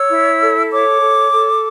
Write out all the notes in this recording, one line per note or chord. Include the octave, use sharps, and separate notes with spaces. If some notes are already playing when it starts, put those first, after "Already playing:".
Already playing: C#5 E6
E4
A4
C#5 D6
A4
A4